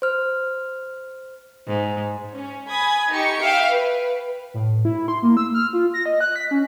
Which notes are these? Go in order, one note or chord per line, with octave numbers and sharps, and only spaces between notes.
C5 F6
G#2
C#4
G#5 B5 D#6 G#6
D#4 G4 C#6 C#7
E5 F5 G5
B4
A2
E4
C6
A#3
E6
F6
F4
A#6
D#5
F#6
B6
C#4